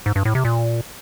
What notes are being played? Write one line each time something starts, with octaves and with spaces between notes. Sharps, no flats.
G#2
G2
A2
C3
A#2